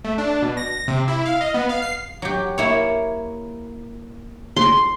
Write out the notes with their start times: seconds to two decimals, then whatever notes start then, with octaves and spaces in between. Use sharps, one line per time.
0.04 A3
0.18 D4
0.42 B2
0.57 A#6
0.88 C3
1.08 E4
1.25 F5
1.41 D#5
1.54 B3
1.69 F5
1.82 C7
2.22 F#3 G4
2.58 A#3 E4 C#5
4.57 C6